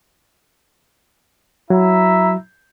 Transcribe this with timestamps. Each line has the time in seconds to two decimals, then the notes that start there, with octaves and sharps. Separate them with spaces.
1.70 F#3 E4 E5 A#5